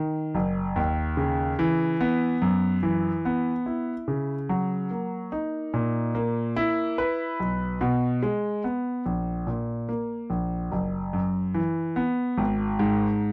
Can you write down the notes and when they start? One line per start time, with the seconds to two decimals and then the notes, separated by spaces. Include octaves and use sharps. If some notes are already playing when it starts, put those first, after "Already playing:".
Already playing: D#3
0.35 F#1
0.76 D#2
1.17 C#3
1.59 E3
2.01 B3
2.42 F#2
2.83 E3
3.25 B3
3.66 E4
4.08 C#3
4.49 F#3
4.91 A#3
5.32 D#4
5.74 A#2
6.15 A#3
6.56 E4
6.98 B4
7.40 B1
7.81 B2
8.23 G#3
8.64 B3
9.06 A#1
9.47 A#2
9.89 A#3
10.30 A#1
10.72 F#1
11.13 F#2
11.54 E3
11.96 B3
12.38 G#1
12.79 G#2